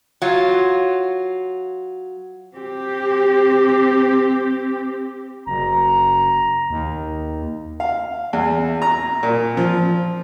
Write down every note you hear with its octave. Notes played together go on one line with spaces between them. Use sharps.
F#3 F4
C4 G4
F#1 A#5
D#2
F5
E2
A#5
A#2
F3